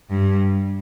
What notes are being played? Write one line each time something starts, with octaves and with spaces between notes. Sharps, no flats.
G2